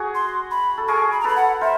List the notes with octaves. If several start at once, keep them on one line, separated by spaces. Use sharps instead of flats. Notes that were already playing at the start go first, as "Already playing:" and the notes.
Already playing: F#4 G#4
C6
B5
A4
G#4 A#4 C#6
B5
A#5
A4 B4 B5
F#5
A#4 C5 E5